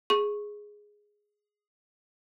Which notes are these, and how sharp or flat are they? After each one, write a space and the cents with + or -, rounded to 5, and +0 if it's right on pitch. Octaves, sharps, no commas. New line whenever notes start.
G#4 +0 C#6 -15